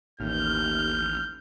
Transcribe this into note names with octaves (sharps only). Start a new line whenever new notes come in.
A1 D#2 F6 G6